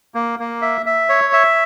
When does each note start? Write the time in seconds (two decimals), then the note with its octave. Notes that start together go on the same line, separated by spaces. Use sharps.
0.15 A#3
0.39 A#3
0.62 E5
0.86 E5
1.09 C#5
1.33 E5